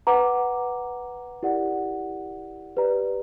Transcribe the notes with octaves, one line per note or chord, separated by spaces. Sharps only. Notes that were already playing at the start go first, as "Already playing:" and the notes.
B4 F#5 A#5 D6
E4 G4 A#4 D5 F#5
G4 B4 D5 A#5